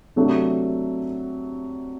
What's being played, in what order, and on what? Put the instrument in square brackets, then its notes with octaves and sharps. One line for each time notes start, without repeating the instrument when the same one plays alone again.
[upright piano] C3 F#3 A3 D4